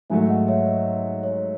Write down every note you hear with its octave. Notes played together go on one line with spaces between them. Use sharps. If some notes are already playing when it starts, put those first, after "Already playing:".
G#2 F#3 A3 E5 G#5
D#5 F#5
C#5 E5
D#5
C#5